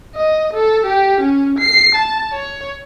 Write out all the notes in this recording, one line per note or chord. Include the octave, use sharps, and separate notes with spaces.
D#5
A4
G4
C#4
C7
A5
C#5